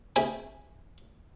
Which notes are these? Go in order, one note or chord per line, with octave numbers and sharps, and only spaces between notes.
C4 G#4 C5 E5 G#5 B5